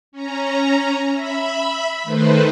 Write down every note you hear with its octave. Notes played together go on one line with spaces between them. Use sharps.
C#4 A#5
E5 B5
D#3 A3 B4 C5